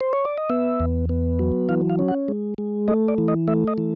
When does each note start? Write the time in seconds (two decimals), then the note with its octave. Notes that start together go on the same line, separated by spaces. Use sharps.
0.01 C5
0.13 C#5
0.25 D5
0.38 D#5
0.50 B3 E5
0.80 E2
1.09 B3
1.39 F#3
1.69 E3 F5
1.90 F5
1.99 C#4
2.08 F#5
2.28 G#3
2.58 G#3
2.88 A3 D#5
3.08 D5
3.18 E3
3.28 D#5
3.48 A3 E5
3.67 D#5
3.78 E3